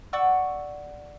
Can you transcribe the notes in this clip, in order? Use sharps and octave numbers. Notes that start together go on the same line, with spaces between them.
D5 F#5 C#6 E6